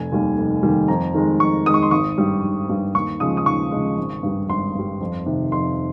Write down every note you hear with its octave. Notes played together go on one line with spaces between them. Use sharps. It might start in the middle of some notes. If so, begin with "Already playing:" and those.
Already playing: F1 G#5
D#2 D#3 G3
F1
D#2 D#3 G3
F2 A#5
D#3 G#3
F2 C#6
D#3 G#3 D#6
C#6
C6
G#1 C#6
G2 G3
G#1
G2 G3
D#2 C#6
C#3 F3 G#3 D#6
D#6
D#2 C#6
C#3 F3 G#3
G#1
G2 G3
G#1 C6
G2 G3
F2
C3 D#3
F2 C6